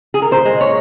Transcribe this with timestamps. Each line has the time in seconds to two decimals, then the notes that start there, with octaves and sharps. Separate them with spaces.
0.14 G#4
0.22 A#4
0.31 A#2 C5
0.45 G#3
0.60 A#2 C#5